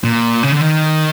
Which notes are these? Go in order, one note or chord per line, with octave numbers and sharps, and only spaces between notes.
A#2
C#3
D3
D#3